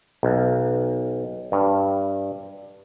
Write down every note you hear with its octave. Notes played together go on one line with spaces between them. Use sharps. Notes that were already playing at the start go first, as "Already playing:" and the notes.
B1
G2